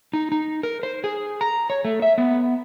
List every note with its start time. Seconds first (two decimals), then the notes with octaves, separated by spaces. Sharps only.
0.13 D#4
0.32 D#4
0.63 A#4
0.83 C5
1.04 G#4
1.41 A#5
1.70 C#5
1.85 A3
2.02 E5
2.18 B3